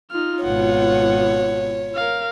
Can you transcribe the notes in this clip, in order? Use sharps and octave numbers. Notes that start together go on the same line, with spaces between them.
D#4 F4 F6
G#1 B2 C#5 F#5
A#4 F5